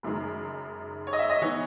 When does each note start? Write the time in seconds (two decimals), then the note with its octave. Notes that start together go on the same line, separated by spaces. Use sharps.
0.03 F#1 F#2 D#3 G#3
1.07 C#5
1.13 D#5
1.19 E5
1.30 D#5
1.41 E3 B3 D#4 C#5